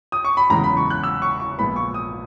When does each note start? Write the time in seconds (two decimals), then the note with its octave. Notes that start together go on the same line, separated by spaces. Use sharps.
0.12 D#6
0.25 C#6
0.37 B5
0.50 F#1 E2 C#3 E3 G#3 A#5
0.64 B5
0.77 C#6
0.90 F#6
1.04 E6
1.22 C#6
1.40 C#6
1.58 A#1 A#2 G#3 B3 B5
1.76 C#6
1.94 D#6